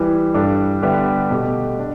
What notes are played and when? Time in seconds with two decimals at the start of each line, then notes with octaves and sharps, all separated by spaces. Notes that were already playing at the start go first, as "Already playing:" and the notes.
Already playing: E3 G3 E4 B4
0.34 G2 G3 D4 A4
0.82 D3 G3 B3 G4 E5
1.31 B2 A3 G4
1.79 D4